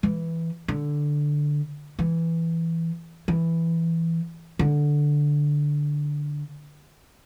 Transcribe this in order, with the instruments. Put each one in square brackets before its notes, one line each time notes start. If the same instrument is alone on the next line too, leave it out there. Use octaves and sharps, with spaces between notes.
[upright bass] E3
D3
E3
E3
D3